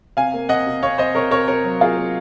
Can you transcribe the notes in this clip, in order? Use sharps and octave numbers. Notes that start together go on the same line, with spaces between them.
C3 F5 G#5
A#3
C3 D#5 F#5
C3
C3 C#5 F5
C3 C5 D#5
C3 A#4 C#5
C3 A#4 C#5
C3 A#4 C#5
F#3
A#3 F4 G#4
A#3